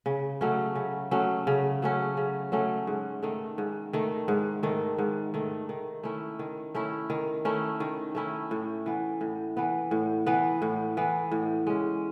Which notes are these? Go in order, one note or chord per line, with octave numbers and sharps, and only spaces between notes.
C#3
F#3 A3 C#4
C#3
F#3 A3 C#4
C#3
F#3 A3 C#4
C#3
F#3 A3 C#4
G#2
D#3 A3
G#2
D#3 A3
G#2
D#3 A3
G#2
D#3 A3
D#3
A3 C#4 E4
D#3
A3 C#4 E4
D#3
A3 C#4 E4
D#3
A3 C#4 E4
A2
E3 B3
A2
E3 B3
A2
E3 B3
A2
E3 B3
A2
G#3 C#4